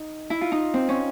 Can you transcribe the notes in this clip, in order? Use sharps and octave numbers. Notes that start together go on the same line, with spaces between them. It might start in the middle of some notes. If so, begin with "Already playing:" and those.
Already playing: D#4
E4
F4
D#4
C4
C#4